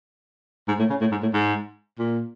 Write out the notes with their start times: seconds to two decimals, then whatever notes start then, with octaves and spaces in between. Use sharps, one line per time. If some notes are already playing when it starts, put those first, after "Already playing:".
0.68 G#2
0.79 A2
0.90 C#3
1.01 A2
1.12 G#2
1.22 A2
1.34 G#2
1.99 A#2